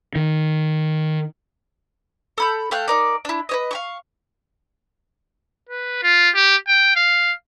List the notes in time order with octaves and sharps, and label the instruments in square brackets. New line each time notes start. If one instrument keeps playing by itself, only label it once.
[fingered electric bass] D#3
[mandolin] A4 B5 G6
A3 F5 G5 F#6
D#4 A#4 D5
D4 E4
B4 C#5 D#5
F5 G5 C#6
[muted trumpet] B4
F4
G4
G5
F5